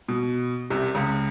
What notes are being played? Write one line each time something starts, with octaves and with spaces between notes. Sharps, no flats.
B2
C2 C3
C#2 C#3